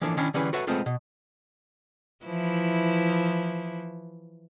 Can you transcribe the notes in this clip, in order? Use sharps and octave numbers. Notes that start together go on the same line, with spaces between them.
E3 F3 A#3 D4 A4
D#3 C#4 D4 E4
D3 E3 G3 C#4 G#4 B4
F#4 A4 B4 C#5 E5 F#5
G#3 A3 B3 C4 F4 A4
B2
E3 F3 E4